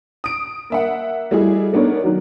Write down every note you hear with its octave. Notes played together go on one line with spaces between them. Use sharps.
D#6 D7
A#3 E5 F#5
G3 A3 E4 F#4 G#4 D#5
A3 B3 D4 D#4 A#4 C#5
D#3 F#3 F#4